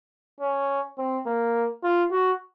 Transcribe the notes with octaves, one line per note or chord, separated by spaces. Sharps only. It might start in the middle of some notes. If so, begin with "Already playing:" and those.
C#4
C4
A#3
F4
F#4